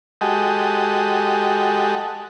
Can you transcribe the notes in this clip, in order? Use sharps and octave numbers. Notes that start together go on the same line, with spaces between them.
G#3 F#4 G4 A4 D#5